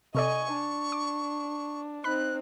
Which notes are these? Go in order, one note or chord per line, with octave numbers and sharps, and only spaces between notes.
C3 A4 D5 D#5 G#5 C#6
D4
D6
C4 D#4 B5 F#6